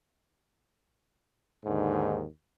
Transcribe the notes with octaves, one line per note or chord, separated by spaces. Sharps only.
D#2 G#2 D3